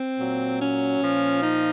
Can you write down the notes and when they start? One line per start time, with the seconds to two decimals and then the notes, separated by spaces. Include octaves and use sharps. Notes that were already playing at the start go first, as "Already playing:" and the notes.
Already playing: C4
0.17 A#2 F#3
0.59 C#4
1.00 A#2 F3
1.41 D#4